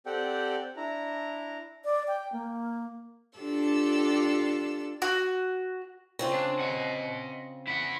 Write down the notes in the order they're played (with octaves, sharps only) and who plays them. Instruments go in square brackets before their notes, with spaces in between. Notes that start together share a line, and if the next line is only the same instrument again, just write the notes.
[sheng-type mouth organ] C4 G4 A4 D5 F#5 G5
D4 E4 A#5
[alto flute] D5
G5
A#3
[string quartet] D4 F4 G4 A4 E6
[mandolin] F#4
[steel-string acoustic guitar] C#3 C4 F4
[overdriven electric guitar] D4
D#5 F#5
E4 F#5